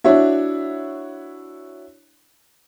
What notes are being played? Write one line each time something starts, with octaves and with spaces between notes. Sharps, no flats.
D4 E4 F#4 C#5 E5